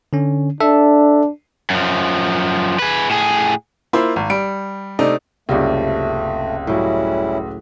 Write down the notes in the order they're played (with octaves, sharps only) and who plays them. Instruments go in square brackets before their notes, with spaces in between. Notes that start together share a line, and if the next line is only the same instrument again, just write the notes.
[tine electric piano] D3 C#4
[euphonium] D4 [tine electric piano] A4 E5
[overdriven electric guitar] F#2 F3
G#4 B4
A2 G#4
[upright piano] A#3 E4 F4 C5
G#1
G3 D7
C3 A3 D4 D#4
[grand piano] F#1 C#2 [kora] C3 G3 F4 [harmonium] A3
[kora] A2 F#3 [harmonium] G3 C#4 E4